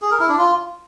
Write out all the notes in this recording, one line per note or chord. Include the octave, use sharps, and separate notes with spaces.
G#4
A#4
E4
D4
F4